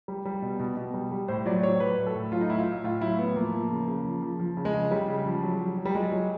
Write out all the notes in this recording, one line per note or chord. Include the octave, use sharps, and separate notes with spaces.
G3
G3
B2
B2
B2
G3
G3
A2 C5
F#3 D5
F#3 C#5
F#3 B4
A2
A4
A2
F#3 F4
D#4
A2 E4
F4
A2
A2 F4
F#3 E4
A2 B3
F3 A#3
F3
C#3
C#3
F3
F3
F3
C#3
G#3
C#3
C#3 G3
C#3
F3
F#3
F#3
F#3
G3
F#3 G#3
F#3